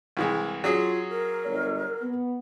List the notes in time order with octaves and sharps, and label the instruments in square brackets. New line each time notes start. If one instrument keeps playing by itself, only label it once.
[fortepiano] C2 E3 G#3
[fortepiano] F#3 C#4 G#4 [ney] F4
[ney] A#4
[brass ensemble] G1 C#5
B3